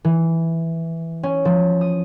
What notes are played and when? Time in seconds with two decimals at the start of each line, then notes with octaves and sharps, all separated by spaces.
0.05 E3
1.23 C#4
1.45 F3
1.81 D#6